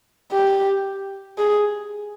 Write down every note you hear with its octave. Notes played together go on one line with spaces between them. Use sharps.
G4
G#4